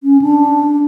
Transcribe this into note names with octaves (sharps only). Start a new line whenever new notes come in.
C#4
D4